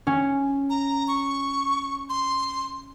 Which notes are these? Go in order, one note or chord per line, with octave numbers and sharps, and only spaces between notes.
C#4
A#5
C#6
C6